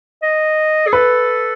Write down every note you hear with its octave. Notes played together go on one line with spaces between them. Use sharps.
D#5
G#4
A4 B4